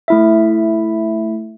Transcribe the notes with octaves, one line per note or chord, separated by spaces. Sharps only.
A3 E4 E5